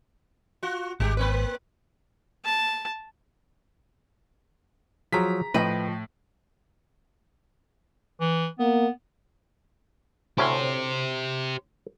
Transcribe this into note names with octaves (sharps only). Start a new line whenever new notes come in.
F4 F#4
G#1 G3 G4
A#3 C4 B4
A5
F3 F#3 G#4 A#5 B6
A2 F3 B4 D#5 G5
E3
A#3 B3
D2 A2 C#4 G4 C5